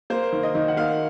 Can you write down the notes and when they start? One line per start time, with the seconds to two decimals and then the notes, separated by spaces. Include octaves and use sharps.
0.10 A#3 C5
0.32 D#3
0.43 D#5
0.55 D#3
0.68 F#5
0.77 A#3 F5